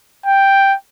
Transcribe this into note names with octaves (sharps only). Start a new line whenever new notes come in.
G5